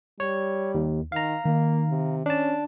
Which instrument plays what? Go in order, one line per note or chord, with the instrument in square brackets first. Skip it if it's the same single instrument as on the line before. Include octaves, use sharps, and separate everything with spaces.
[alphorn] G3 [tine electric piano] C#5
[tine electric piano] D#2
[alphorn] D#3 [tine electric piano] F5 A#5
[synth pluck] D#3 [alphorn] A#3
[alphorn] C3
[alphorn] C#4 [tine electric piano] D4 A5